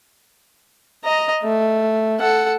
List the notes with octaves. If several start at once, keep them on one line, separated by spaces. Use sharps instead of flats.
D#5 A#5
A3
A4 F#5